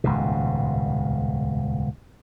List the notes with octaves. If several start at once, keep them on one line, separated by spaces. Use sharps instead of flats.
D#1 C#2 G#2 B2